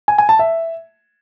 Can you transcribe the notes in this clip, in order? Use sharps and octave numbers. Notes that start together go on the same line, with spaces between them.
G#5
G#5
A5
E5